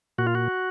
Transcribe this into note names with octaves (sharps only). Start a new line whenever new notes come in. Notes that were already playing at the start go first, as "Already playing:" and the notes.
A#2 F#4
F4
F#4